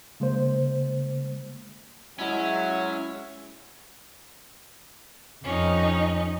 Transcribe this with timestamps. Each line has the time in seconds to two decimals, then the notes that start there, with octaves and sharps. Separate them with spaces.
0.20 C#3 G#3 A#3 C5
2.19 F#3 G#3 C#4 E4 E5
5.44 F2 C#4 D#4